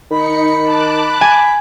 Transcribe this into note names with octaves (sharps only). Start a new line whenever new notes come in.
D#3 D#4 B5 C#7
A5 D6 F#6
G#5